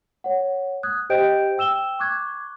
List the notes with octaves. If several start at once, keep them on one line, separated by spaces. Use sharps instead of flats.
C#5 F#5
D#6 F#6 G#6
G4 C5 D#5 G5 G6 D7
G5 E6 E7 G7
C#6 D6 F#6 G#6